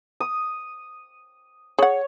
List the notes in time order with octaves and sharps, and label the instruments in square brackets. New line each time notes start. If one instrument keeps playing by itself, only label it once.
[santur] D#6
[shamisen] G#4 F#5 [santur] C#5